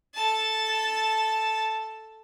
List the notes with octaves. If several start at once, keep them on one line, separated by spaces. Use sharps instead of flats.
A4 A5